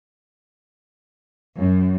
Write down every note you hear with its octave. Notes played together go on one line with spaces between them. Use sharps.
F#2